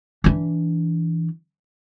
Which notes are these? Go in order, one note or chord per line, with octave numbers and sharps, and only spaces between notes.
E3 D4